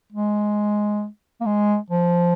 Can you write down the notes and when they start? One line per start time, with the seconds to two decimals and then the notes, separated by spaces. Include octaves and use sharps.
0.13 G#3
1.41 A#3
1.46 G#3
1.90 F3